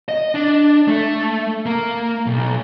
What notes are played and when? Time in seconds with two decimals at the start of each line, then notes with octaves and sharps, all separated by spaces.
0.09 D#5
0.35 D4
0.88 A3
1.66 A#3
2.26 B1